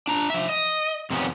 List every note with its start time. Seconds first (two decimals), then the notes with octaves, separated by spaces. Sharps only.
0.08 D4 A#5
0.30 F3 E5
0.49 D#5
1.10 F2 C3 D#3 F3 B3 C#4